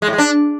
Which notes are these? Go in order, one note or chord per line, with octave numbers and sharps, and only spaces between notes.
G#3
A2
G#3
D4